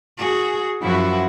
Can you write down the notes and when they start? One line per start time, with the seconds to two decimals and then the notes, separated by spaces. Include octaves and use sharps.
0.18 F#4 G#4
0.82 F#2 F3 E4 F#4